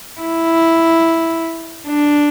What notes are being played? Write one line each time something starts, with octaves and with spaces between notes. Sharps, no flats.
E4
D4